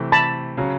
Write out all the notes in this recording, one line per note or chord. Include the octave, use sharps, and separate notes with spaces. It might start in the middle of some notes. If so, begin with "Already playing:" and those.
Already playing: C3 E3 A3
A5 B5
C#3 F#3